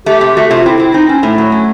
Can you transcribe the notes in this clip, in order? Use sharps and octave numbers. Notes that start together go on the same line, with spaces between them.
A3 G4
C3
A3 F#4
C3 F4
C4 E4
C4
C4 D#4
C4 C#4
A2 A3
F#3
C#4